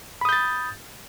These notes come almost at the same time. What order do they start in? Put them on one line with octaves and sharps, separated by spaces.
B5 D#6 G6 A6